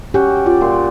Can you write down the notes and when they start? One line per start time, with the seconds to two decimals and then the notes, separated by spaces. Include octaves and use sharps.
0.14 C#4 F#4 G4 G5
0.46 F4 D5
0.61 A#2 C6